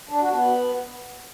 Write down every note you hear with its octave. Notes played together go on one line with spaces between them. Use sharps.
D4
F#4
B3